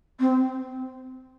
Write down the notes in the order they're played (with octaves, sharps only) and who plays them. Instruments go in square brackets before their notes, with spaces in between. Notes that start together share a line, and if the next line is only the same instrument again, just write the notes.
[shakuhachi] C4